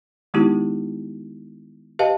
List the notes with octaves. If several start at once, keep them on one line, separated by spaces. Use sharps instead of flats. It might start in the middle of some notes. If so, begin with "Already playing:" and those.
D#3 G#3 B3 D#4 E4 G4
G4 B4 D#5 F5 A5